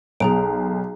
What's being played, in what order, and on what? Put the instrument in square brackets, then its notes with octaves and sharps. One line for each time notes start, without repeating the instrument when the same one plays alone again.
[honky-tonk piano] B1 [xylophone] G#4 A#5 D7